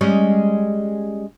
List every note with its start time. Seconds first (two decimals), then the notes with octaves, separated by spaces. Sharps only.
0.01 G3 G#3 C#4